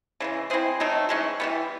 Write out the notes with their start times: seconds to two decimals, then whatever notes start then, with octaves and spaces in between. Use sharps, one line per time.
0.20 C#3 E3 G#3
0.50 C4 E4 G#4 C5
0.80 F#3 A3 C4 D#4
1.09 E3 G#3 C#4
1.40 E3 G3 B3